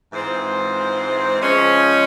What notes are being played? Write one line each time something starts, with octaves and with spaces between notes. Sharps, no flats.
G#2 E3 G#3 C4 F4
F3 G#3 C#4